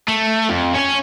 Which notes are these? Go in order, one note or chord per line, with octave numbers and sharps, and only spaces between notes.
A3
F2
C#4 C#5